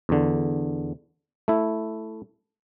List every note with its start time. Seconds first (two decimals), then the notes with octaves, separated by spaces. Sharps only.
0.09 E2 D3
1.48 A3 E4